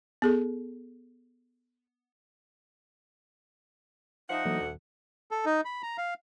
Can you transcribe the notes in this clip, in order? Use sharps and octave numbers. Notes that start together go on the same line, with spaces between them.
B3 G#4 A4
F3 D#4 E5 F#5
D2 E3 F#3 A#3
D#1
A4
D#4
B5
A#5
F5